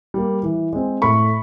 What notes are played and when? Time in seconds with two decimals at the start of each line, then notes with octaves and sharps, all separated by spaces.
0.14 G3 A#3
0.43 E3
0.73 G#3 C4
1.02 A2 B5 C#6